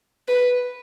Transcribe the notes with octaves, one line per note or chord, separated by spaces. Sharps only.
B4